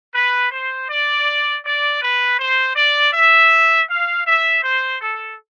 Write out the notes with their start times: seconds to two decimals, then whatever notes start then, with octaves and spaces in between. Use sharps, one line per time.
0.15 B4
0.51 C5
0.90 D5
1.65 D5
2.02 B4
2.40 C5
2.76 D5
3.13 E5
3.89 F5
4.26 E5
4.64 C5
5.01 A4